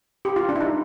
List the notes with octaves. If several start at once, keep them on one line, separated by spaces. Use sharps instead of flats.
G4
F4
D4
E4
D#4